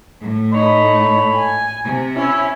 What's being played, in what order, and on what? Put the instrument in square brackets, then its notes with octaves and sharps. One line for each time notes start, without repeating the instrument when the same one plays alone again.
[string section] A2
[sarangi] D#4 [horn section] A4 C#5 B5
[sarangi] G#5
[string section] C3
[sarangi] C#4 [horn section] E4